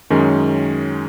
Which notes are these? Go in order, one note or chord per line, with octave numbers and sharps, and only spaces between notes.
F#2 D#3 G#3 C#4